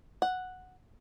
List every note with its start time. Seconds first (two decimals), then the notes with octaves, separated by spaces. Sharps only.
0.22 F#5